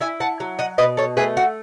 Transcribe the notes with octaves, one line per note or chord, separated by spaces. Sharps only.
E4 E5 G#5
F#5 A5
F#3
D#5 F#5
B2 B4 D#5
A4 C#5
A3 G#4 B4
F#4